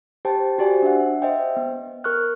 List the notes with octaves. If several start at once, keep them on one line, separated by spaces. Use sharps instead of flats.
G4 C5 G5 A5
F#4 G4 C5 D5 G#5
D4 E5 F#5
C5 D#5 E5 G5
B3
A#4 C#6 F6 F#6